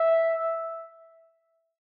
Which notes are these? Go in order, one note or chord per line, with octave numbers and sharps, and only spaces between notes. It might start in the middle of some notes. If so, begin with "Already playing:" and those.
Already playing: E5